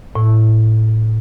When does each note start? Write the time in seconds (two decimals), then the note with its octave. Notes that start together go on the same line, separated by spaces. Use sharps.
0.15 A2